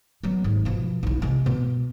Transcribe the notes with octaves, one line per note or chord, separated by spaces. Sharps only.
F#3 B3
G#1
B2 F3
B1 E4
C3 G#3
B2